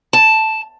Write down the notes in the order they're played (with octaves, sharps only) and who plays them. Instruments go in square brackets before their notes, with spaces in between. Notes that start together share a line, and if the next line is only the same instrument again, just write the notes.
[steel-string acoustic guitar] A5